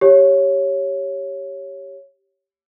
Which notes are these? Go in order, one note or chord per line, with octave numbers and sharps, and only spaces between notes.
G4 C#5